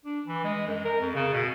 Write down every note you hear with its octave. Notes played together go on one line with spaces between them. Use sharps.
D4
E3
G#3
F#2
A#4
F2
C#3
B2